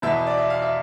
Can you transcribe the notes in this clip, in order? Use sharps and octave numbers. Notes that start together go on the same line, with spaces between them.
E2 B2 B3 E5
D5
E5
F5
E5